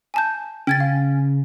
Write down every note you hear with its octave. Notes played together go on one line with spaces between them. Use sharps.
G#5 A5 G6
C#3 C#4 G5 G#6 A6
F5